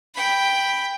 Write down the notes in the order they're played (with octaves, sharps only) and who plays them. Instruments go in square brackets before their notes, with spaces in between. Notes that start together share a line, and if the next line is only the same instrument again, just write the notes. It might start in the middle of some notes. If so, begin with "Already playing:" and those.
[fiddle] G5 B5